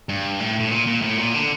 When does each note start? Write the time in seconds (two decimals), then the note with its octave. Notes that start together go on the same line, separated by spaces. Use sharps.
0.09 G2
0.40 A2
0.60 A2
0.71 A#2
0.87 A#2
1.02 A2
1.18 A#2
1.34 D3